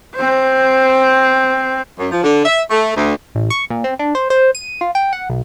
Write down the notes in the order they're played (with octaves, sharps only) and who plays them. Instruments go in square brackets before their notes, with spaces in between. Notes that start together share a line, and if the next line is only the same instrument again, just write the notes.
[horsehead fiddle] C4 C5
[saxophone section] F#2
F3
D3
E5
A3
D2
[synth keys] A1
C#6
A#2
C4
D4
C5
C5
D#7
F4
G5
F#5
B1